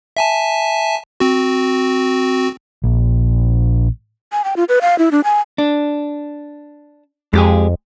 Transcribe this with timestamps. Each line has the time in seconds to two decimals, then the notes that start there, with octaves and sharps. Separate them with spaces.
0.17 E5 G#5 A5
1.20 C4 F#4
2.84 A#1
4.32 G#5
4.44 G5
4.56 F4
4.69 B4
4.81 F5
4.98 E4
5.11 D4
5.24 G#5
5.58 D4
7.33 F2 G#3 G4 G#4